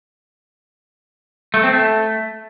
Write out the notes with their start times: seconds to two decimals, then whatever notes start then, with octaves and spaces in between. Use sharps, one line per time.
1.54 A3
1.64 C4
1.73 A3